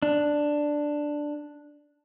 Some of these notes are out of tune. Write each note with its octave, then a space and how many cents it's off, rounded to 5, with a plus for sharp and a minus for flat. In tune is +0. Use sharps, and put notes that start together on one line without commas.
D4 +5